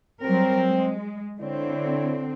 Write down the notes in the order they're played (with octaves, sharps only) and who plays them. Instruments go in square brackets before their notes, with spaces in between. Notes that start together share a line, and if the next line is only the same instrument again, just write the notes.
[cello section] F#3 G3 A#4 [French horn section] C4
[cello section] G#3
[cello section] D3 C4 [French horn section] E4 C#5 D5